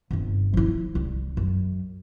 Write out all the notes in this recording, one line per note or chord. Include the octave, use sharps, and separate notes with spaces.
G1 C3
F3 E4
C2
F#2